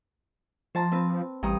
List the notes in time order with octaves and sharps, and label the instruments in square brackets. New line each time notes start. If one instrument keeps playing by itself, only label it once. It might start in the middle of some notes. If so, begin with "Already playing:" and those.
[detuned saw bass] F3 [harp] C5 A5 A#5
[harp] C4 B4
[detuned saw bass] A1 [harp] G2 A#5 D#6